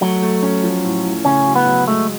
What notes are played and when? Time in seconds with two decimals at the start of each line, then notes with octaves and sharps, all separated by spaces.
0.02 F#3 A3
0.22 A3
0.43 C#4
0.64 F3
0.84 A2
1.04 A2
1.25 C#3 C#4
1.46 F#3
1.56 B3
1.67 F#3
1.87 G#3 A3